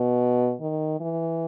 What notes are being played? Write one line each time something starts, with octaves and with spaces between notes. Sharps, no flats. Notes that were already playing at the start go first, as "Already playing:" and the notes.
Already playing: B2
D#3
E3